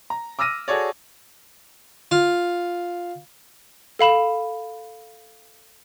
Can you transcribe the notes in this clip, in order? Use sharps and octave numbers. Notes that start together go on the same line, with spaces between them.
A#5
D6 E6 F6 A#6 D#7
F#4 G#4 A4 C#5 D5
F4
A4 F5 B5 E7